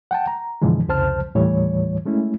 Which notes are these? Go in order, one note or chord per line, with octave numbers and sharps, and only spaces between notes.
F#5 G5 A5
A#5
F#2 B2 D3 E3 F3 G#3
C2 F2 C#3 C5 A5 F6
D#2 A2 E3 G3 C#5
G#3 A3 C#4 E4